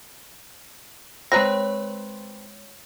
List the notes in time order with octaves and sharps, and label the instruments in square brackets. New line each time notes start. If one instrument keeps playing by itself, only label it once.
[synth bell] G#3 C#5 C6 [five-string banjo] C4 B4 A#5 [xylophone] A#6